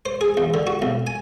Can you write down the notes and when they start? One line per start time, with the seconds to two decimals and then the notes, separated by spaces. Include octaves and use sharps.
0.06 C5
0.21 G#4
0.37 E2
0.54 D3
0.67 F#4
0.82 B1
1.07 G#5